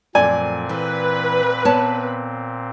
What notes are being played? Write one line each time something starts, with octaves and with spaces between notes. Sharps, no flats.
F#2 A#2 F3 A3 C4 D5 G#5
E3 B4
B3 C#5 A5